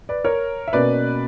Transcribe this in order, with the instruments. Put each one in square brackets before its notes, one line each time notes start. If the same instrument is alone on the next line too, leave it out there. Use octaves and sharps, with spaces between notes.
[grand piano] B4 D5
A#4 C#5
E5
B2 A#3 C#4 B4 D5